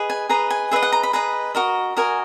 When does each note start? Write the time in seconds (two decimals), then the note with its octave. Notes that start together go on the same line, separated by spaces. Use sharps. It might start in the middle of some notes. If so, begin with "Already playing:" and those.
Already playing: G#4 B4 D#5
0.10 G#5
0.29 G#4 B4 D#5 A#5
0.50 G#5
0.71 G#4 B4 D#5 E5
0.83 F#5
0.92 A#5
1.03 B5
1.13 G#4 B4 D#5 A#5
1.55 F#4 A#4 D#5
1.97 F#4 A#4 D#5 G#5